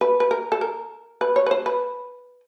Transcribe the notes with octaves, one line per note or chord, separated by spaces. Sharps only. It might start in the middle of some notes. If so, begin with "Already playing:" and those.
B4
B4
A#4
A4
A#4
B4
C#5
B4
C5
B4